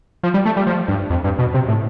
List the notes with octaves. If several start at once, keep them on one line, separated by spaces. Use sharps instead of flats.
F3
G3
A3
G3
F3
G2
F2
G2
B2
C3
A2